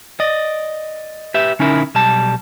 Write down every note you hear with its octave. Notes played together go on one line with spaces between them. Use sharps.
D5 D#5
G4 B4 E5
D3 C#4 D#4 E4 A#4
B1 G3 A5